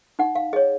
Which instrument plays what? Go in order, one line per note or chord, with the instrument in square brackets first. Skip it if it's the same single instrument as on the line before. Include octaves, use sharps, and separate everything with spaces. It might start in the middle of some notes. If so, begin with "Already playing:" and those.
[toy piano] D#4 F#5
F5
G#4 D#5
C#5